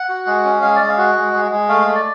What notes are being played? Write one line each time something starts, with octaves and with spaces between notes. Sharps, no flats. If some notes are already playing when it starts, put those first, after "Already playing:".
Already playing: F#5
F#4
G#3
C#4
G#3 F5
D5
G#3
F5
F#4
G#3
G#3
G#3
A3 F5
A3
D5